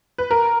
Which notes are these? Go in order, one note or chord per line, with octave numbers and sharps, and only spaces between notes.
B4
A#4 A#5